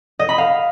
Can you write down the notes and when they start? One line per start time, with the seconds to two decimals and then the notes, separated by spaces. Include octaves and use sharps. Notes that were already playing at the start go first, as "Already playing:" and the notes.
0.19 D#5
0.29 B5
0.38 F5